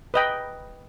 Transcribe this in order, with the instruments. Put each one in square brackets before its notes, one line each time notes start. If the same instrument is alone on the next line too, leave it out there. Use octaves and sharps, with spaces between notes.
[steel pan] B4 D#5 G5